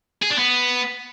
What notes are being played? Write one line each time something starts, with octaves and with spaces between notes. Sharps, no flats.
G#4
D4
B3